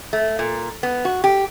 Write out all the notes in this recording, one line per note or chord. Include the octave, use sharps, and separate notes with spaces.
A3
A#2
B3
F#4
G4